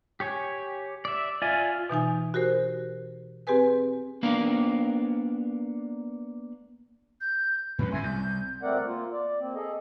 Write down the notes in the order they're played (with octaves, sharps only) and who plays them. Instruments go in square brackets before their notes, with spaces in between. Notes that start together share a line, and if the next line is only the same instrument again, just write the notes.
[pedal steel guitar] G4 C#5 G#5
D5 E5
[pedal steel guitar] F4 [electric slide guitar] D5 E5 G#5
[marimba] B2 E3 D#4 G#5
F#4 G4 A#4 C5
C4 G4 G#4 B4 G#5
[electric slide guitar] A#3 B3 D4 A#4 F5
[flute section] G6
[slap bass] G#2 F#3 C#4 [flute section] B4
[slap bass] F#1 G#2 [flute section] E4 G#5 C6
[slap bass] C2 [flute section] G6
[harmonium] D2 A3 C4 A#4 D5 F#5
A#3 F4
D5
A#3 C4
G#4 A4 D#5